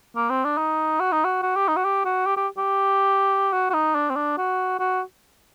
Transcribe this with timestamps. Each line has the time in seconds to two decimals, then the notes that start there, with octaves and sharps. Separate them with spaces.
0.16 A#3
0.30 C4
0.44 D4
0.58 D#4
1.00 F#4
1.12 D#4
1.24 F#4
1.42 F#4
1.56 G4
1.68 D#4
1.76 F#4
1.85 G4
2.05 F#4
2.26 G4
2.37 G4
2.58 G4
3.53 F#4
3.70 F#4
3.74 D#4
3.95 D4
4.10 C4
4.16 D4
4.38 F#4
4.79 F#4